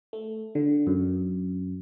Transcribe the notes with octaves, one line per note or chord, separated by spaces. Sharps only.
A3
D3
F#2